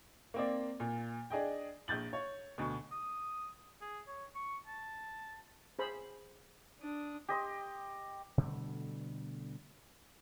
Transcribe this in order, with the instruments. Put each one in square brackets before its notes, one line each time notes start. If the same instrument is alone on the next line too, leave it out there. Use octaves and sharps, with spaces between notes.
[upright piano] A#3 C4 D5
A#2
D4 G#4 D#5 G5
A#1 G6 A6 F#7
C#5
D2 B2
[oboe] D#6
G#4
C#5
C#6
A5
[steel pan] G#4 C5 B5
[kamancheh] D4 D#6
[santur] G4 D#5 C6
[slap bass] B2 D3 G3 A3